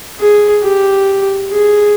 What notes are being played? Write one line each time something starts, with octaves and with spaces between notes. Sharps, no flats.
G#4
G4
G#4